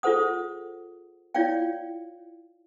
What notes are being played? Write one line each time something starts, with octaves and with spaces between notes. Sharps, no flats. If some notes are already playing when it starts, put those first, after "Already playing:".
F4 G#4 A4 C5 F#5 D#6
E4 F4 C#5 D5 F5 G5